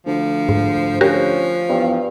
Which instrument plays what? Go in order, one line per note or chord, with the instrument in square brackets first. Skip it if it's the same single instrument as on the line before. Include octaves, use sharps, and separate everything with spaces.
[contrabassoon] D2 [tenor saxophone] F3
[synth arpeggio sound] G#2
[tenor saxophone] F3 [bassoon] C#4 [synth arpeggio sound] F#4 G4 A#4
[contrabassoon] E2 [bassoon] G2